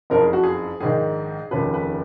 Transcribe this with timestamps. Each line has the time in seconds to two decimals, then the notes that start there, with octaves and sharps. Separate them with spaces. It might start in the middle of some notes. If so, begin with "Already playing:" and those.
0.10 F#1 F2 F3 A#4
0.21 G#4
0.33 F#4
0.43 G#4
0.80 A#1 G#2 D#3 G#4
1.51 F1 D#2 C#3 F3 B4
1.74 B4